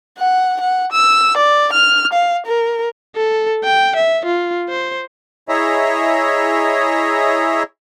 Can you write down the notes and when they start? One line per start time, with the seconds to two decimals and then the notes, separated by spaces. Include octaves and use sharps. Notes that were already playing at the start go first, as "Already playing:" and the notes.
0.18 F#5
0.61 F#5
0.92 E6
1.37 D5
1.73 F6
2.13 F5
2.46 A#4
3.16 A4
3.64 G5
3.96 E5
4.26 F4
4.69 C5
5.49 E4 G#4 C#5 D#5 E5 A#5